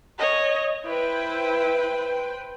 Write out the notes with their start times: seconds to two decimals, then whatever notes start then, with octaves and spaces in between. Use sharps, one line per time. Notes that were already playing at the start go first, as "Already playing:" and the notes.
0.19 C#5 D#5
0.85 E4 B4 C5 G5